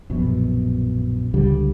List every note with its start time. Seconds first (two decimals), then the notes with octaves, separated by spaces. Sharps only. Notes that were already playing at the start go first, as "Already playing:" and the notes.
0.10 A#1 F#2 B2
1.34 C#2 D3 G3